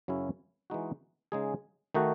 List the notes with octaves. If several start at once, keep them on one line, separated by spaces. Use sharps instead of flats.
F#2 C#3 F#3 C#4 E4
E3 G#3 D#4 F#4
C#3 G#3 D#4 G#4
D#3 A3 D#4 F#4